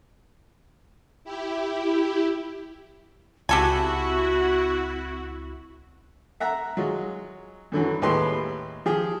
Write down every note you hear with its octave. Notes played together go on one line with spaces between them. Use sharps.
E4 G4
C#2 C4 E4 F#4 G4 A4 G#5
E5 F#5 A#5
F#3 G#3 F4
F#2 D3 E3 F#3
D#2 A2 G#3 G4 B4 C6
F3 G4 G#4